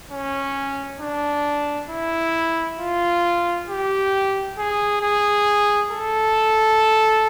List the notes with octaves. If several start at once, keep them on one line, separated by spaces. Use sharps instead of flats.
C#4
D4
E4
F4
G4
G#4
G#4
A4